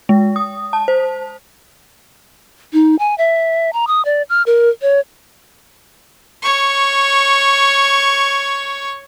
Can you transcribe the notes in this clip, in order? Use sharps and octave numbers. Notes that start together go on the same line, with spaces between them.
G#3
D#6
A5
C5
D#4
G#5
E5
A#5
D#6
D5
F6
A#4
C#5
C#5 C#6